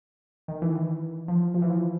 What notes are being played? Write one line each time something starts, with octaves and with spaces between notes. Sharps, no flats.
D#3
E3
E3
F3
F3
E3
F3